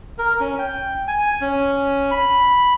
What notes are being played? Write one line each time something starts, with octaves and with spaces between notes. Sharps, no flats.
A#4
C#4
G5
G#5
C#4
B5